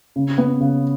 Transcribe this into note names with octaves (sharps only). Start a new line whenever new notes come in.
C#3
B3
C#3